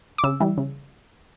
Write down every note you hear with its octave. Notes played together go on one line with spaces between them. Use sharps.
D6
C#3 E6
E3 G3
C#3